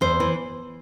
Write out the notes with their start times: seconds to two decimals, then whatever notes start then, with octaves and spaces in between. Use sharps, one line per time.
0.01 E2 C5
0.20 E3